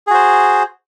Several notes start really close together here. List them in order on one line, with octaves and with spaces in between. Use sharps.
G#4 F#4 C5